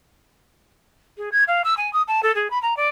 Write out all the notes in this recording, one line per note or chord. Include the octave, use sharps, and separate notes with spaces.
G#4
G#6
F5
E6
G#5
D#6
A5
A4
G#4
B5
A#5
D5